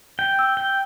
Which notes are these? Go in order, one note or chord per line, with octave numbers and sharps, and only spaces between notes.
G5
E6
G5